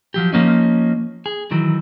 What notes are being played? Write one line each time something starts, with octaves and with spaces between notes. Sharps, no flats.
F3 F#3 G4
F3 A#3 C#4 D#4
G#4
D#3 E3 F#3